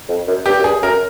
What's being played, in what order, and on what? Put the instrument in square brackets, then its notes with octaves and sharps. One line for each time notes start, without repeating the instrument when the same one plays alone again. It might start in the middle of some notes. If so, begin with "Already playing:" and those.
[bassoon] F2
F#2
[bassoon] G2 [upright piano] G4
[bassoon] F#2
[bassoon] G2 [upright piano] G#4
[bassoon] F#2 [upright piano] A#4